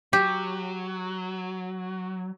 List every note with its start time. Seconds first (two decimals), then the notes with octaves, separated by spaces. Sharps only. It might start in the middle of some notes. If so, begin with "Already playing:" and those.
0.13 F#3 G4